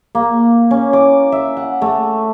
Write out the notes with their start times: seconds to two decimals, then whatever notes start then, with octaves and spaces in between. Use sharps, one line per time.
0.15 A#3
0.71 C#4
0.93 D6
1.32 E5
1.57 F#5
1.82 A3